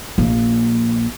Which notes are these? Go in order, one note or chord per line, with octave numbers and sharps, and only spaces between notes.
A#1 A#3